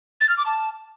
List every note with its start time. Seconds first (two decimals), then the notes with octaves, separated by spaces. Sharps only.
0.21 A6
0.29 F6
0.38 D6
0.46 A5